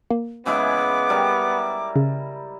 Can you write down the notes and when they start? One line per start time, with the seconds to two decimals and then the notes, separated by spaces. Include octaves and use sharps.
0.11 A#3
0.46 C#3 G#3 B3 E4 D6
1.10 G3 A#4 D5
1.96 C#3